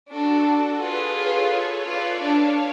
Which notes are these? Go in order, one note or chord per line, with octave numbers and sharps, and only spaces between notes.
D4 F#4 A4
F4 G#4 B4
A4 C#5
F4 B4 D5
D4 C#5 F5